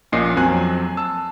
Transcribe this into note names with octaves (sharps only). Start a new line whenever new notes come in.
A#1 A#2 C#4 D#5 C7
F2 F#3 C4 G#5 F#6
A5 E6